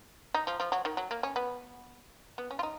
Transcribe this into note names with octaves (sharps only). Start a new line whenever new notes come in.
D#4
F3
F3
F#3
D#3
F#3
A#3
C#4
B3
B3
C#4
F4
D#4